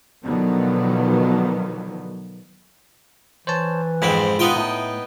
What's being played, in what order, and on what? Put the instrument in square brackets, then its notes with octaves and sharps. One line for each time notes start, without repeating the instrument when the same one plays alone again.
[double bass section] B2 D3 D#3 F3 F#3 B3
[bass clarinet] E3 [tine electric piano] C5 C#5 A5
[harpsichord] F2 G#2 C4 [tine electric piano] G#3 B5
[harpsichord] B3 D#4 G5 [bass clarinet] F4
[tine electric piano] A2 [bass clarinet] A3